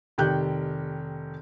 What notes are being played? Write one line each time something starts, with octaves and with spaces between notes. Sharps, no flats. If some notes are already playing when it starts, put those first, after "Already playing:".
F1 D#3 G4 F#6 G6